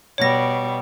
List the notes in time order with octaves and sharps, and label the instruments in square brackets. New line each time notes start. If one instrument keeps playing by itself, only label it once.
[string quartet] B2 G3 [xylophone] C#5 A#6